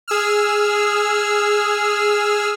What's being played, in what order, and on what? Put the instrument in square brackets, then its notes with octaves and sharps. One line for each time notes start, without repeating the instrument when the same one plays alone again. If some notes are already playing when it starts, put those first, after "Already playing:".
[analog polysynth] G#4 E6 F6